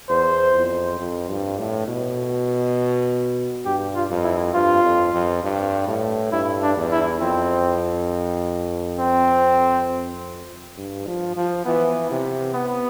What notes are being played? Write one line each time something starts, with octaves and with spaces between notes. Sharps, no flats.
E2 C5
F2
F2
G2
A2
B2
G2 G4
F4
F2
E4
G2 F4
F2
F2
G2
A2
G2 E4
D4
E2
E4
F2 C4
C4
G2
F3
F3
E3 B3
C3
B3